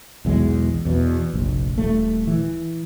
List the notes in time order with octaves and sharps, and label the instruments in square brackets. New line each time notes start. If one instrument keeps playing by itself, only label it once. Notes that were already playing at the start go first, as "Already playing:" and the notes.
[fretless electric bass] B1 E2 G#3
E2 B2
F1 A#1
D#1 A3
E3